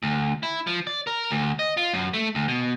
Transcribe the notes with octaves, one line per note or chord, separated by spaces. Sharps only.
D2
E4
F3
D5
A#4
D2
D#5
F4
F#2
A3
D2
B2